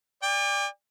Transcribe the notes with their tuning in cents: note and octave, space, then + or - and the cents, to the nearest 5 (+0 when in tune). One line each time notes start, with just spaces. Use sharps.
D5 +0 G5 +45